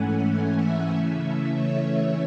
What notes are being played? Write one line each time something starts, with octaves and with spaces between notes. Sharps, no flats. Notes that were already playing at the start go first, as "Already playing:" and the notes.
Already playing: G#2 E3 A3 C#4 F#5 G#5
F#5
E5
C#3 E3 A3 C#4
C#5